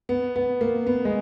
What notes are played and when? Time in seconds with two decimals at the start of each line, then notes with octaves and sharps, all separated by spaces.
0.09 B3
0.36 B3
0.61 A#3
0.87 B3
1.05 G#3